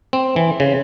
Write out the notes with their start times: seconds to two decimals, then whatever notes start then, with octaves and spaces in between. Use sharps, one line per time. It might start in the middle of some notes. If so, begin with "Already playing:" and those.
0.13 C4
0.36 E3
0.60 C#3